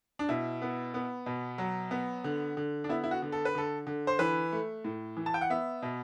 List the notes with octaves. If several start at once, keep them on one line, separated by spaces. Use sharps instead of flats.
D4
B2 E4
B3
B3
B2
F#3
B3
D3
D3
D4
B3 E4
E4
F#4
D3
A4
B4
D3 A4
D3
C5
E3 B4
A3
A2
E3
A5
G5
F#5
B3 E5
B2